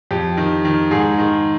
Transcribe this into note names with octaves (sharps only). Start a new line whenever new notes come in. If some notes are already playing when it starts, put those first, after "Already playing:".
F2 G4
D#3
D#3
G#2 G#4
D#3